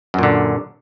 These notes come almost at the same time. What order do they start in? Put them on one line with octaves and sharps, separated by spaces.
F#2 A#2 D3